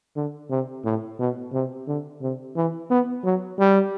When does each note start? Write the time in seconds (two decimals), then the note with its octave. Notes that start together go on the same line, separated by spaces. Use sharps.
0.16 D3
0.50 C3
0.85 A2
1.19 B2
1.53 C3
1.87 D3
2.22 C3
2.56 E3
2.90 B3
3.24 F#3
3.59 G3